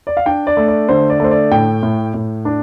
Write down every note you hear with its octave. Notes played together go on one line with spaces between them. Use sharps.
D5
F5
D4 G5
D5
A3
D5
D3 C5
D5
A3 C5
D5
A2 G5
A2
A2
D4